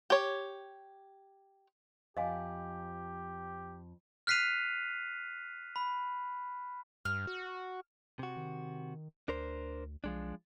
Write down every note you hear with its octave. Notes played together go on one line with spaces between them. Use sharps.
G4 C#5
F2 F3 G4 D#5 F5 G#5
F6 F#6 B6 C7 D#7 F7
B5
G2 F6
F#4
C3 F#4
D#3
D2 D4 A#4 C5
B1 F3 G#3 D4